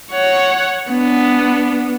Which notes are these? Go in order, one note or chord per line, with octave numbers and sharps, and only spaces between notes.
C#5 F#5
B3 D4